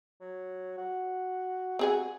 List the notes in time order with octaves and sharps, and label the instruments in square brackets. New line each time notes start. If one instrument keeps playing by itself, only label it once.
[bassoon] F#3
F#4
[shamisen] C4 G#4 G#5 [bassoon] F#4